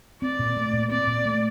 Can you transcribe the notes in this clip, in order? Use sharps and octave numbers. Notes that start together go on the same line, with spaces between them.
C4 D5
A#2
A3
A#2
C4 D5
A#2
A3